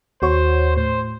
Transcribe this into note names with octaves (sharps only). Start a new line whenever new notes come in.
D#2 F#4 C5 C#5
A2 C5